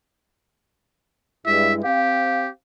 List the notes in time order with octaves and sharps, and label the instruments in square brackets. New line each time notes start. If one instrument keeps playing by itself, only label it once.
[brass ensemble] G2 G#3 E4 [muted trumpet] E5
[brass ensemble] C4 F5 [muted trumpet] G4